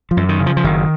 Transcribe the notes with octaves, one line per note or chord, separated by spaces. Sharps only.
F3
F#2
D#3
C#3
F3
F3
F#1 D#3